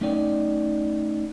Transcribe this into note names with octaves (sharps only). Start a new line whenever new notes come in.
A3 C#4 D#4 D5 G5